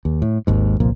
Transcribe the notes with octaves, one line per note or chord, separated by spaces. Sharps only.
D#2
A2
G#1 D#2 G#2
G1 C2 A#2 F3